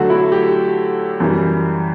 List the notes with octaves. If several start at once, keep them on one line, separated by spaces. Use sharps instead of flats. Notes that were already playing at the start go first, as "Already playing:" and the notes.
Already playing: D3 F#3 A3 F#4
E4
G4
F#2 E3 G3